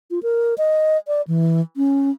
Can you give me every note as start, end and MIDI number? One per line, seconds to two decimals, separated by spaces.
0.11 0.19 65
0.23 0.54 70
0.58 0.97 75
1.07 1.22 74
1.28 1.61 52
1.77 2.10 61